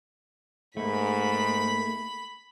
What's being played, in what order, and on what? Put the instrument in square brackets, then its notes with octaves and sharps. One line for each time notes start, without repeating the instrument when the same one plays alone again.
[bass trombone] G#2 [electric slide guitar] A3 A#3 [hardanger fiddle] B5